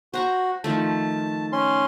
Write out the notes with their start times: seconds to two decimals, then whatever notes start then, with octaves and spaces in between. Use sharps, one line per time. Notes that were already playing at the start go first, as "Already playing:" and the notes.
0.14 F#4 C5 A#5 C#6
0.64 D#3 F3 A3 A5
1.53 C#4 C6